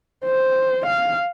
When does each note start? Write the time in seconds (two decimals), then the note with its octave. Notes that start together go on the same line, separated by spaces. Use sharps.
0.25 C5
0.86 F5